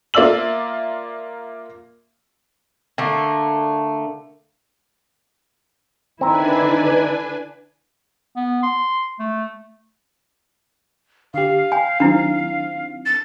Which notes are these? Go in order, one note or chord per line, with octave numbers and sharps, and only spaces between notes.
A#3 F4 D5 E5 E6 F#7
D3 A3 A#3
D3 D#3 C4 D4 E4 B4 G#5 A#5
B3
C6
A3
D3 G4 F5
G5 G#5
D#3 F#3 C4 D4 E4
A6